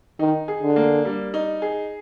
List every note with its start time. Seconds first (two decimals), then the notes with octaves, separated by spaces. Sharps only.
0.19 D#3 D#4
0.48 G#4
0.62 D3
0.76 A#3
1.05 G3
1.34 D#4
1.62 G#4